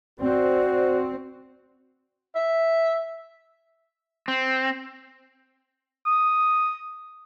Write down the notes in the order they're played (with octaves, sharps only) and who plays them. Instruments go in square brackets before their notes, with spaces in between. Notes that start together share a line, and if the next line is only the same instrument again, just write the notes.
[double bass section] C4 [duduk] F#4 [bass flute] D5
[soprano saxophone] E5
[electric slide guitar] C4
[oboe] D#6